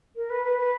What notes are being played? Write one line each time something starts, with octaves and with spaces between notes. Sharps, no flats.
A#4
B4
B4
B4